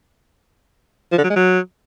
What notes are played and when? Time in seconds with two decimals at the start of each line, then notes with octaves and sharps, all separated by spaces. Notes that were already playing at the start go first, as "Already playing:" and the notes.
1.12 F3
1.18 D3
1.24 F#3
1.30 G#3
1.36 F#3